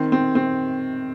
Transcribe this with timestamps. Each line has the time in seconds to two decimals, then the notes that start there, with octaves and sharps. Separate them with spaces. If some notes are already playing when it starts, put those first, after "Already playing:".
Already playing: D#3 C4
0.12 C4
0.35 C4